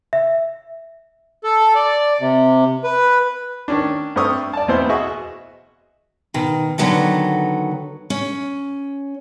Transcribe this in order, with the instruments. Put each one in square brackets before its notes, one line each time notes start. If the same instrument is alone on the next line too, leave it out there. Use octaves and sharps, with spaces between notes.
[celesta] E5
[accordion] A4
D5
C3
B4
[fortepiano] D#3 C#4 D4
G2 A3 C4 C#6 D#6 F6
D5 A5
E2 B2 B3 C4 E4 C5
F#4 G#4 D#5 E5 C#6
[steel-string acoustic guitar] B2 D#3
D3 D#3 F#3 B3 F#4 A4
C#4